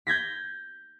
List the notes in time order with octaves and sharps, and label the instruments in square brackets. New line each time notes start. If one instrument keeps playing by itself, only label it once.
[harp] G6 G#6 A#6 B6